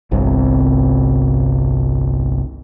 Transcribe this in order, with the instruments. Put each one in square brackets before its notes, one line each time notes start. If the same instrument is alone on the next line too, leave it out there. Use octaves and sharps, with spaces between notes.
[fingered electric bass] G1 C2 C3